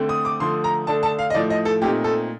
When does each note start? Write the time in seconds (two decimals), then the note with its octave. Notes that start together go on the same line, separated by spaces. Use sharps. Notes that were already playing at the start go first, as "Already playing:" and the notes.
Already playing: D3 A3 C4
0.09 D#6
0.25 D6
0.40 D3 F3 A3 C6
0.64 A#5
0.87 D3 A3 D4 A5
1.03 A5
1.19 F5
1.30 D#5
1.34 A2 F3 A3 D5
1.50 D#5
1.65 A4
1.81 A#2 A3 C4 D#4 G4
2.04 A4